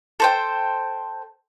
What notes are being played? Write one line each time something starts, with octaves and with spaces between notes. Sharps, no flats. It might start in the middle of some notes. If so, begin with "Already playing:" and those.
A4 C5 G5